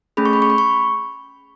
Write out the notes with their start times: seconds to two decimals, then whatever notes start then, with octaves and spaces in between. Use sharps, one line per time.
0.17 A3 C#4 G#4 B5
0.25 C#6
0.33 B5
0.42 C#6
0.50 B5
0.58 C#6